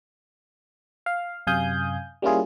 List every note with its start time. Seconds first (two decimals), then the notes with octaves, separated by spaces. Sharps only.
1.06 F5
1.47 F#2 C3 F5 G#5 D#6 G6
2.22 G3 A#3 C#4 E4 F4 G#4